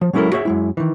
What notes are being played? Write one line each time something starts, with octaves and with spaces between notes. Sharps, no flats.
F3
F#3 G#3 C#4 E4 A4 A#4
F#4 G#4 C#5 E5
F#2 G#3 E4
D#3 E3